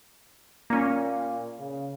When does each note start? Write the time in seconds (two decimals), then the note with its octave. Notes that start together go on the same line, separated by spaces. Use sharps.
0.70 A#2 A#3 C#4
1.59 C#3